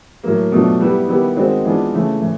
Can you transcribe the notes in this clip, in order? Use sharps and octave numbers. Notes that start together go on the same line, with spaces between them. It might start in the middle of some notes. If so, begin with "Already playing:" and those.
A2 F#3 A#3
B2 F#3 A3 D4 F4
G3 B3 E4 G4
D#3 G3 B3 E4 G4
D#3 G#3 C4 D#4 F#4
E3 G#3 B3 D4 F4
C#3 E3 A3
A2 E3